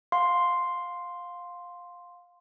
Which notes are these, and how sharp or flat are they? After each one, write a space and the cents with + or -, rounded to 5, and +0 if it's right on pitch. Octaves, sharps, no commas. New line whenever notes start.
F5 +20 C6 +0